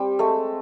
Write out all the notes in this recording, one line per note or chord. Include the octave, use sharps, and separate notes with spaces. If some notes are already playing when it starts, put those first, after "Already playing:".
Already playing: G3 C4 G4
G#3 A3 A4